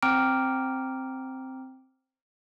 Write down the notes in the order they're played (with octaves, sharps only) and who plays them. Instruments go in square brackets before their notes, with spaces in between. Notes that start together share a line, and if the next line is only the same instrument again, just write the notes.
[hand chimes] C4 G5 A#5 D6 F6 D7